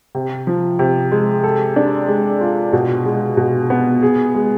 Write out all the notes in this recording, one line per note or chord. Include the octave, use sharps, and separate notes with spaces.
C3
F3
C3
G#3
A4
D4
G#3
F4
B2
G#3
B2
B3
G#4
G#3